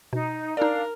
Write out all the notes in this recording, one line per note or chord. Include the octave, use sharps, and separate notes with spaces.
B2 D#4
D4 D#4 A#4 D5 F5